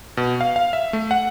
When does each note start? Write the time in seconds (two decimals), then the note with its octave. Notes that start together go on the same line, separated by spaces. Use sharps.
0.17 B2
0.41 F5
0.56 F5
0.73 E5
0.93 A3
1.11 F#5